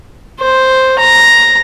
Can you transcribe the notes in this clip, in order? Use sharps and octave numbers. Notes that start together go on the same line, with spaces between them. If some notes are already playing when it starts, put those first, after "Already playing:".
C5
A#5